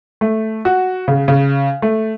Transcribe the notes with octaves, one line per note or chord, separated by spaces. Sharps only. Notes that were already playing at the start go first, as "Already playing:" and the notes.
A3
F#4
C#3
C#3
A3